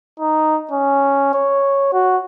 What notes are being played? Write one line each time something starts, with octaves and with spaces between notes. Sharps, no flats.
D#4
C#4
C#5
F#4